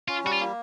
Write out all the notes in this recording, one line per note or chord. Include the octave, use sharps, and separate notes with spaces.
C#4 F4
G3 F#4
F4
A#3